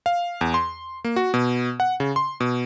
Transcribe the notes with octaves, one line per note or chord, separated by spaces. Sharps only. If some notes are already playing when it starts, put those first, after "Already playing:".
F5
E2
C6
A#3
F#4
B2
F#5
C#3
C6
B2